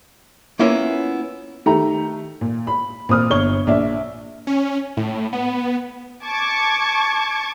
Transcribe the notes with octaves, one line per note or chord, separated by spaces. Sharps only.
A#3 B3 C#4 E4 F4 A#4
D#3 A3 G4 A#5
A#2
B5
A#2 C4 D#6 F6
G1 C#5 C#6 G7
A#1 D5 E5
C#4
A2
B3
A5 C#6 D6 G#6